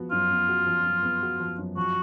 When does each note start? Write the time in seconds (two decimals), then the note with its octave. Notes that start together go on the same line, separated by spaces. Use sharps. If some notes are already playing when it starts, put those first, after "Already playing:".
Already playing: F3 B3 F#4
0.11 F#2 F4
0.31 B3
0.48 F#4
0.66 F3
0.85 F#2
1.03 B3
1.22 F#4
1.40 F3
1.58 F#2
1.77 F3 F#4